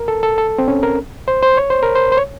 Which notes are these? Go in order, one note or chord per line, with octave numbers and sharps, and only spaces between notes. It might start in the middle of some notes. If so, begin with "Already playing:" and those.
Already playing: A#4
A4
A4
A4
C4
C#4
A#4
C5
C5
C#5
C5
A#4
C5
C5
C#5